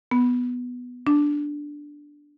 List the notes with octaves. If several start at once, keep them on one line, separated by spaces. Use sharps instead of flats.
B3
D4